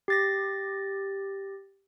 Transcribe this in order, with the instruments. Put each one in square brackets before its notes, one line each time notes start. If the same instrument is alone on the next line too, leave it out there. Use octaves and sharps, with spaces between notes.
[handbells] G4 A6 A#6